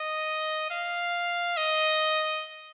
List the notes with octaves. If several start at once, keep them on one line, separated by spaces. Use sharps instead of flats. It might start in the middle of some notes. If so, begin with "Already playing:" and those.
Already playing: D#5
F5
D#5